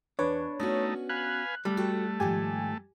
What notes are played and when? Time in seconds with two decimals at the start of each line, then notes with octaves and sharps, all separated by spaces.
0.19 E2 D4 B4 C#5
0.60 A3 B3 C#4 D#4 F#4
1.09 B4 F5 G#5 F#6
1.65 G3 A3
1.77 F#4 A4 G5
2.20 G#2 D#3 F3 G4 G#5